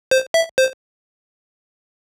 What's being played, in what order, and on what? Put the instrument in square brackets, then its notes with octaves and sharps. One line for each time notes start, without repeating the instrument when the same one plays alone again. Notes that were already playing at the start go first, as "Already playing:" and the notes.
[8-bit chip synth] C5
E5
C5